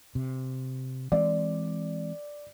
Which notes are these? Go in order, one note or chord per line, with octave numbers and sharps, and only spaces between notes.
C3
E3 G#3 C4 D5